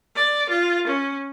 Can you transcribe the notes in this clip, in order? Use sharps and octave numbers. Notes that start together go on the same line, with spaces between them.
D5
F4
C#4